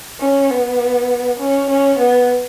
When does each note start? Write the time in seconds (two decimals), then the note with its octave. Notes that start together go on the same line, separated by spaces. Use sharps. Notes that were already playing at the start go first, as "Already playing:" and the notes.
0.20 C#4
0.50 B3
1.39 C#4
1.70 C#4
1.99 B3